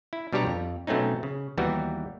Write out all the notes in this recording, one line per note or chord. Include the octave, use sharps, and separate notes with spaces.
E4
B2 G3 D4 G4 C#5 A#5
F2
B2 F#3 A3 C4 C#4 D#4
C#3
D#2 E3 G3 B3 D#4 F#4